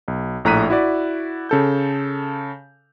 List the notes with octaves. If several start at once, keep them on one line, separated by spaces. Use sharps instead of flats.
B1
A#1 A2 A#5 F#6 B6 D#7
E4 F#4 D5
C#3 A4 G6